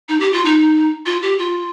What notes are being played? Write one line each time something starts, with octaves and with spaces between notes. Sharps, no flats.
D#4
G4
F4
D#4
F4
G4
F4